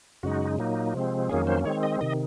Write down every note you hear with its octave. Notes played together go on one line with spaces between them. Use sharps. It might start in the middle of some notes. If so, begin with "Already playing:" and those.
F#2 C#3 G#3 D#4 F#4
A#2 F#3 A#3 D#4
C3 F3 G#3 C4
F2 D#3 F#3 A#3 C#4 G#4
C5
D#3 G#3 C4 C#5
D#5
C3 D#3 D#5